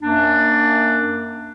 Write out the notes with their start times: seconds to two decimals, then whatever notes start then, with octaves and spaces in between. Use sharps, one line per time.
0.02 F#2 A#3 D4